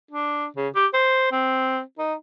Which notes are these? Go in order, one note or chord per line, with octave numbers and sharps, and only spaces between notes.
D4
C#3
G4
C5
C4
D#4